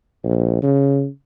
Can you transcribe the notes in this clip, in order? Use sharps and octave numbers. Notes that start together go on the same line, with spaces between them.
A#1
C#3